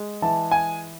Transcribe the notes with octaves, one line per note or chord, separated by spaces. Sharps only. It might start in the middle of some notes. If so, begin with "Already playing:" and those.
Already playing: G#3
E3 A5
G#5